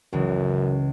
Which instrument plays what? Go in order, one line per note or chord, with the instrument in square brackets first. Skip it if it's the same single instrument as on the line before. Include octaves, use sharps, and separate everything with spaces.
[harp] C#2 C#3 E3 [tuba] F#2